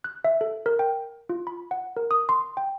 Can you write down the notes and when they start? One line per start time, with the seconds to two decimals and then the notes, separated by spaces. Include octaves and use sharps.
0.04 F#6
0.25 E5
0.41 A4
0.66 A#4
0.79 G5
1.29 F4
1.47 B5
1.71 F#5
1.97 A#4
2.11 D#6
2.29 C6
2.57 G5